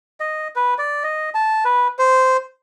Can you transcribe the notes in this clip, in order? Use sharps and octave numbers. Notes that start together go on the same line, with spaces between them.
D#5
B4
D5
D#5
A5
B4
C5